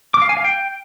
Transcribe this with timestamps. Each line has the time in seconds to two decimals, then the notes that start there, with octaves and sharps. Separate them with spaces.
0.14 D6
0.22 F5
0.29 G#5
0.37 F5
0.44 G5